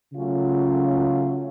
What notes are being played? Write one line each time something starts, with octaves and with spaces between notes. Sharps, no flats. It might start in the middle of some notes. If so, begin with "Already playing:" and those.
C#3 F#3 A3 C#4 F4